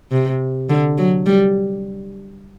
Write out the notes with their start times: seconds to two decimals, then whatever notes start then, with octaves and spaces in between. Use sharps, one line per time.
0.11 C3
0.69 D3
0.98 F#3
1.26 G3